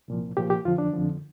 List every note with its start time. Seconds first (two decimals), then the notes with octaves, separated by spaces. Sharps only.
0.08 C2 A#2 F3
0.37 C2 A#2 F3 G4
0.50 G4
0.65 F2 D3 F3 F4
0.78 D4
0.93 F2 D3 F3